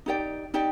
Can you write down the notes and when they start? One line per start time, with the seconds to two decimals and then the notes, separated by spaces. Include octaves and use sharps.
0.06 D#4 G4 D5 G5
0.54 D#4 G4 D5 G5